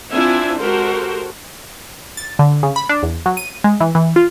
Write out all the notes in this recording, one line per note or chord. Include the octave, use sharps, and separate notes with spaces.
C4 D4 E4 F4 E5 G#5
G#3 F#4 G4 A4 A#4 C5
A6
D3
C#3
B5
D4
E2
F#3
D#7
G#3
E3
E3
F4